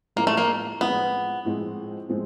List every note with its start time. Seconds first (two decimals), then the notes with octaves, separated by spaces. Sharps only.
0.16 A2 F3 G#3 A#3 C4
0.27 A3
0.37 A#3
0.81 A2 F3 G#3 B3 C4
1.45 A2 F3 G#3 C4
2.09 A2 F3 G#3 C4